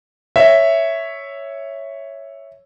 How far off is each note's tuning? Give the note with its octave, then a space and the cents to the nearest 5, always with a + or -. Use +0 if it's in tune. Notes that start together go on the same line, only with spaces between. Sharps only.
C#5 +0 E5 +0